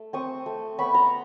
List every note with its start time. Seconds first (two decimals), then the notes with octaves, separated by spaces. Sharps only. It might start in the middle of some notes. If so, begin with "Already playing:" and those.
Already playing: A3
0.13 C4 C#6 D#6
0.46 A3
0.79 B3 B5 C#6
0.94 A#5 C6